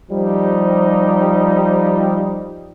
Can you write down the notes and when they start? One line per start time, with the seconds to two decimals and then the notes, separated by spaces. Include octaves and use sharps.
0.11 F3 G3 D#4 G4